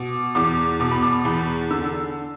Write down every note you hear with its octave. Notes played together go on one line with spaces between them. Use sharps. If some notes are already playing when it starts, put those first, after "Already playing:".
Already playing: B2 D6
E2 D6
B2 D6
B5
D6
E2 B5
D3 E6